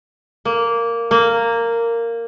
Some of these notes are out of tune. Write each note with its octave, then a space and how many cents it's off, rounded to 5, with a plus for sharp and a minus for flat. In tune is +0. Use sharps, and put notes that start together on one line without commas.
A#3 -5
A#3 -10